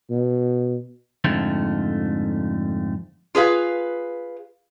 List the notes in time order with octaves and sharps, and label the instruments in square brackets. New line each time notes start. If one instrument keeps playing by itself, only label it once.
[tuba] B2
[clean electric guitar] F2 G#2 D3 F3 A3
[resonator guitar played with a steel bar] F4 G#4 B4 F5